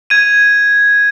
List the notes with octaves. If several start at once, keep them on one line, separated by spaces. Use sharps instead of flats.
G#6 D#7